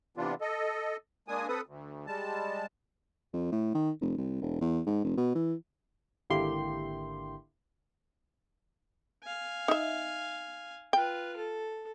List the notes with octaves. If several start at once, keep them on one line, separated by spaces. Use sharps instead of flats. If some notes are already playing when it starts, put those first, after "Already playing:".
C3 E3 B3 D4 F4
A4 D#5
G#3 A#3 D4 G#5 D#6
C4 A4 B4 D#6
D2
G3 G#3 A5
F2
A2
D#3
F1
C2
E1
E2
G#2
F1
B2
E3
G#1 D3 A#3 E4 G4 C6
F5 G#5
D#4 E5
F4 B4 G5
A4